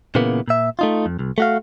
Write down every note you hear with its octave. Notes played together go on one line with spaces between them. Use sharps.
A#2 C#3 E3 A#3 B3
A#2 E5
A3 D#4 F4
F2
C2
A3 F#4 F5